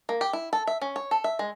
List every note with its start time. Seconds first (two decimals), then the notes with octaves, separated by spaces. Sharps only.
0.09 A#3
0.21 G4
0.33 E4
0.53 A4
0.67 E5
0.82 C#4
0.96 C#5
1.11 A4
1.24 E5
1.39 G#3